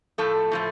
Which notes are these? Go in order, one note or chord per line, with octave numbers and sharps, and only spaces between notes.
A2 F3 A3 A4
A2 F3 A3